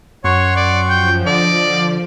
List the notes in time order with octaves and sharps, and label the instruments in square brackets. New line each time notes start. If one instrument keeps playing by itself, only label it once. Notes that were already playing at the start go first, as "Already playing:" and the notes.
[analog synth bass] F#2 [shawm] C#5 [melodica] F#5 C6 C#6
[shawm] D5
[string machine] F3 [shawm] G5
[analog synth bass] D3 [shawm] D5 [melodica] D#5